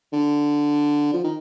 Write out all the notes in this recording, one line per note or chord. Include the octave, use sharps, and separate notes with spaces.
D3
F3
D#3